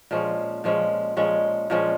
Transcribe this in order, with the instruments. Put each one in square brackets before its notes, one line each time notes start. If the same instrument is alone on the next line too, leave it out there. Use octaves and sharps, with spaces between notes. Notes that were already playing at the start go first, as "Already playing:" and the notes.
[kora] A#2 F3 G#3 C#4
A#2 F3 G#3 C#4
A#2 F3 G#3 C#4
A#2 F3 G#3 C#4